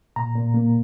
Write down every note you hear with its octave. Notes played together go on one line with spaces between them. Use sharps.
A#2 A#5
A#2
A#3